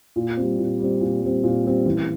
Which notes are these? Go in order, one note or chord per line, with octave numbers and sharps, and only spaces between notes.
A#2
G3 C4
A#2
G3 C4
A#2
G3 C4
A#2
G3 C4
A1